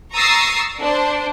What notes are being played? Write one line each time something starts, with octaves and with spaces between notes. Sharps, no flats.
A#5 C#6 D#6 E6 A6 C7
D4 C5